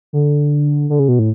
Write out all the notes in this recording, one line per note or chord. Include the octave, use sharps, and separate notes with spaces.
D3
D3
C#3
B2
A2